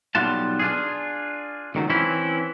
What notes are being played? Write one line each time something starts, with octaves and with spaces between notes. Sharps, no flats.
B1 G3 F4 F#5 A5
D4 F4 G#4
C#2 D#3 F#3 A3
E3 C4 C#4 E4